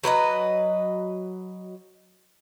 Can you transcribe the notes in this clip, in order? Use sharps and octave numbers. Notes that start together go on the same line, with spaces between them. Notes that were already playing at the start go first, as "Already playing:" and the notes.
F#3 B4 C5 D#5